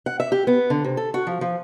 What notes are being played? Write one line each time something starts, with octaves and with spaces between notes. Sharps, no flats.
F#5
E5
G4
B3
D3
C3
A4
F#4
F3
F3